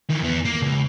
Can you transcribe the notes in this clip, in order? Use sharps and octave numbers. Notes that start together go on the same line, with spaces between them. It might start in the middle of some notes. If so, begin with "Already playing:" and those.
D#3 E3
E2 B3
A#3
C#2